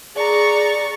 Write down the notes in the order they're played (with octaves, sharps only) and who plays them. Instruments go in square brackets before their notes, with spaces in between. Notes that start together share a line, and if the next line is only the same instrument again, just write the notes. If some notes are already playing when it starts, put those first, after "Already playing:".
[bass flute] G#4 [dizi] D5 [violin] A#5 C#6